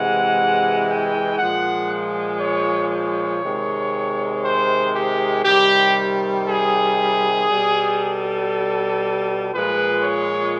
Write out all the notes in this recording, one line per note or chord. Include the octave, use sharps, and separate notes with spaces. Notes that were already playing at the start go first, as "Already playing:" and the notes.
Already playing: C3 E3 G#3 F#5
G5
A#2 F3 G#3 F#5
C#5
C#5
C3 D#3 G#3
C5
G4
C3 D#3 G3 G4
G#4
B2 G3
A4
A#2 F3 G#3 B4
C#5